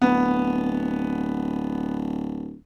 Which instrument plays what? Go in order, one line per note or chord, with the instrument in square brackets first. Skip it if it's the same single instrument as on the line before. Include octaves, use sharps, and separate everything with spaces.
[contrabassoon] D1 [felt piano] B3